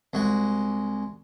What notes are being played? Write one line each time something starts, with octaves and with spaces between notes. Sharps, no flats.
C2 G#3 F#4